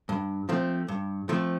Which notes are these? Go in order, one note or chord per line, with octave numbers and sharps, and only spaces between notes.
G2
F3 A3 C4
G2
F3 A3 C4